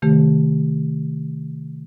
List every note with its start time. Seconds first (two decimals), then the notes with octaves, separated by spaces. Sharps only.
0.02 C3 D#3 A3 G4